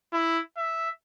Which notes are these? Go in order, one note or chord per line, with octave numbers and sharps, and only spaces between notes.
E4
E5